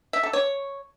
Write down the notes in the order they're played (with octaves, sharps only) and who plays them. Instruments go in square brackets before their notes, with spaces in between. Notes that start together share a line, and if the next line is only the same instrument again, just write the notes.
[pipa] E5
A4
C#5